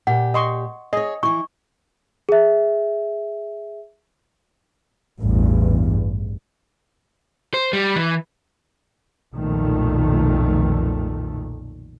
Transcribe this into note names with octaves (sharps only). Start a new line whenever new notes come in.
A#2 G4 F#5
D#5 C6 C#6
G#4 C#5 D#5
E3 E4 C#6
G#4 E5
A1 E2 G2
C5
G3
E3
B1 F2 A#2 D#3 A3